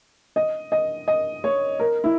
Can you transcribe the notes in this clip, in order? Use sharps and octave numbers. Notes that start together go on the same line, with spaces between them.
D#5
D#5
D#5
C#5
A#4
E4